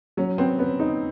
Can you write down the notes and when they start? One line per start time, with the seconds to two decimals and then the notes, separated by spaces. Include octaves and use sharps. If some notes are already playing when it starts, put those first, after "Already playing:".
0.17 F#3 C#4
0.38 B3 C4
0.59 B3 C#4
0.80 D#4